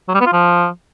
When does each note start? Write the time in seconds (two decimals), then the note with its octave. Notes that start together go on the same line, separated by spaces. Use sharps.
0.08 F#3
0.14 G3
0.20 B3
0.26 F4
0.32 F3